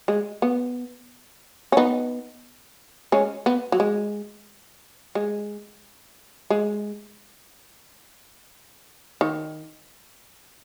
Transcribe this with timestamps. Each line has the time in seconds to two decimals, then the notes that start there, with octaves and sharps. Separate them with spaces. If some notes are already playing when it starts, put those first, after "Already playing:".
0.08 G#3
0.42 B3
1.72 C#4
1.77 B3 D#4
3.12 G#3 C#4
3.46 B3
3.72 F#3
3.80 G#3
5.15 G#3
6.50 G#3
9.21 D#3